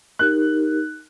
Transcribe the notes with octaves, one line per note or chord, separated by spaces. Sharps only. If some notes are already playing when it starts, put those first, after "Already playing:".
D#4 G4 A#4 F#6